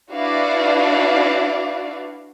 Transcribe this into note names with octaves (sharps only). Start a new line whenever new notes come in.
D4 E4 F#4 B4 D5 F5